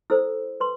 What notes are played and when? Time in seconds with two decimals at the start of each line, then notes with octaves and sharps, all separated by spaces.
0.10 E4 A4 C5 E6
0.60 B4 C6